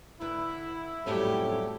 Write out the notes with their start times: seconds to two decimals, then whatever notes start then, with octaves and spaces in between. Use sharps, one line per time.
0.21 D3 E4 B4
1.06 F2 A2 F#3 G3 C#4 G4 A4